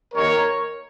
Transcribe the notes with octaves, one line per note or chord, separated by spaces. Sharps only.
D#2 D#3 A#3 A#4 C#5